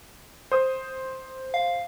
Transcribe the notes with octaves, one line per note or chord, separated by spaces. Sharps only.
C5 D#6
F5